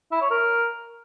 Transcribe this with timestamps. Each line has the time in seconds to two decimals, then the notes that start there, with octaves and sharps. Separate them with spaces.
0.11 E4
0.21 C#5
0.31 A#4